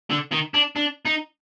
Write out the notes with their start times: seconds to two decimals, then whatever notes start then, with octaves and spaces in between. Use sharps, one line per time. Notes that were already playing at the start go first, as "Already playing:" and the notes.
0.10 D3
0.32 D#3
0.54 D4
0.76 D4
1.05 D#4